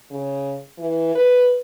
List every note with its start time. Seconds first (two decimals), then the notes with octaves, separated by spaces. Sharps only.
0.11 C#3
0.78 E3
1.15 B4